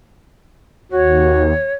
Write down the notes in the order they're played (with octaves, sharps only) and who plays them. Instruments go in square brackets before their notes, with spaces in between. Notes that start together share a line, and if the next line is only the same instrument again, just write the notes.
[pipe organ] D#2 [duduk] F#4 [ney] C#5